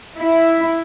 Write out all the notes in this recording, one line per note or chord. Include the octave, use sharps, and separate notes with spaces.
E4